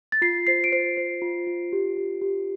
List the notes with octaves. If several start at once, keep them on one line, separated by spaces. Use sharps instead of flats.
A6
F4 C7
C5 C7
D7
C5 C7
C5
F4
F4
G4
G4
G4